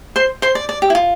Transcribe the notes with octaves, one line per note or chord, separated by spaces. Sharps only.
C5 C6
C5 C6
D5
D5
G4
E4
F4